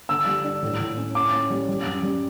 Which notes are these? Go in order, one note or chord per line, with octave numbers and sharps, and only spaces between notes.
D3 E6
G3
D4
A2
A2
C#4
C#4 D6
C#4
G3
G3
F#2
G3